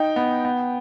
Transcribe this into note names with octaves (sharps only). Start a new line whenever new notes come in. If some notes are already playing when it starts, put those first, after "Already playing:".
Already playing: D#4 G5
B3
B3